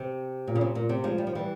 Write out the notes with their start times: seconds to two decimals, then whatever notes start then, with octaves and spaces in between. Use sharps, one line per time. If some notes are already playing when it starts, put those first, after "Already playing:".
Already playing: C3
0.47 A#2
0.55 C#3
0.61 C3
0.75 A#2
0.89 C3
1.04 F3 G#3
1.18 G3
1.27 F3
1.35 E3 G3